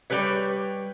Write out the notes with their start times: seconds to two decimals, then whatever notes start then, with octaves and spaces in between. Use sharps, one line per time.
0.10 G3 G4 B4 C#5